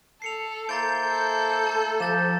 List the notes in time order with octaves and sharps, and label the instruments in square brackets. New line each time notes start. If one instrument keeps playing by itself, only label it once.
[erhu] A4 [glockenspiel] C7 C#7 F7
[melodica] A#3 E4 C5 [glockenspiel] A#5 A6 D7 [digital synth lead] G6
[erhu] A4
[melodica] A3 [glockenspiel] A5
[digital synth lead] F3 [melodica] G4 [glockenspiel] G6 A6 E7